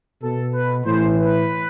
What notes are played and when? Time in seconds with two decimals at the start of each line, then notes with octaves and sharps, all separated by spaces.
0.22 B2 A4
0.54 B4
0.85 A2 E3 C5
1.16 B4